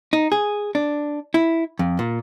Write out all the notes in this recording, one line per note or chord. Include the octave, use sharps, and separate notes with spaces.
D#4
G#4
D4
E4
F2
A#2